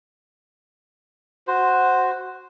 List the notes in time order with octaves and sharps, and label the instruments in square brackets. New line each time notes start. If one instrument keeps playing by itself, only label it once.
[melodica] F#4 C5